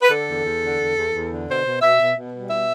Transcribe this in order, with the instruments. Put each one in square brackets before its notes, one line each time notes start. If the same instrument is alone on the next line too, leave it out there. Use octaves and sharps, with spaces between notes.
[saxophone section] B4
D3 A4
E2
E2
D3
E2
E2
E2
D3
B2 C5
B2
B2 E5
B2
B2
G3
B2 E5